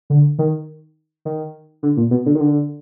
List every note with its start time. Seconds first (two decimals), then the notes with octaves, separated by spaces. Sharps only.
0.10 D3
0.39 D#3
1.25 D#3
1.83 D3
1.97 A#2
2.11 B2
2.26 D3
2.35 D#3
2.40 D3